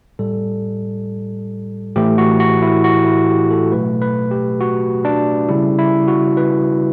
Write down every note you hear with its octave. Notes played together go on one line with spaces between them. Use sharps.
A2 G3 A4
A2 E3 A3 G4
F#4
F#4
E4
F#4
E4
G4
A4
B2 F#3 A3 B4
B4
G4
F#4
D4
C#3 G3 E4
E4
F#4
B4